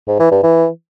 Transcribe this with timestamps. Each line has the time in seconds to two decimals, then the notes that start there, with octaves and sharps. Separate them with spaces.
0.08 G#2
0.20 E3
0.31 G2
0.43 E3